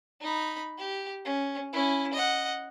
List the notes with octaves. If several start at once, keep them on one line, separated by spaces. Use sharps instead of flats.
D#4 B5
G4
C#4
C#4 E4
D#5 F#5